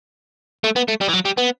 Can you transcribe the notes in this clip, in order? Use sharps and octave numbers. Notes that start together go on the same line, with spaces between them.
A3
B3
A3
G3
E3
F#3
G3
B3